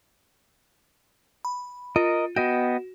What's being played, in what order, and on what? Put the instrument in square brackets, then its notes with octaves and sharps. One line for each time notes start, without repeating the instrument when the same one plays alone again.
[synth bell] B5
[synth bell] F4 [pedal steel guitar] A#4 D#5
[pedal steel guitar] B3 D#5 G5 [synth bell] F#4